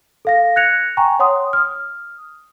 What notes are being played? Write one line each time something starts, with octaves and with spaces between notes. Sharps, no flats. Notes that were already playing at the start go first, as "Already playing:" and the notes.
A4 F5 A#6
F#6 G#6 A#6 C#7 F7
G5 G#5 A#5 C#6
C#5 F#5 C6 D#6
D#6 F6